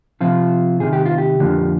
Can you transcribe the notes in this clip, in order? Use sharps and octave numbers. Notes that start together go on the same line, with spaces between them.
C3 F3 C4 F4
C2 C3 D#3 G#4
G4
F4
G4
F2 D3 F3 A#3